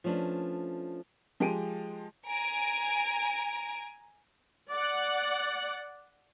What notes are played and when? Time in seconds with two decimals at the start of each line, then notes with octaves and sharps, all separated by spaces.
0.04 F3 A3 C#4 D4 B4
1.40 F3 G#3 G4 D7 D#7
2.28 G#5 A#5 D7
4.70 D5 F#5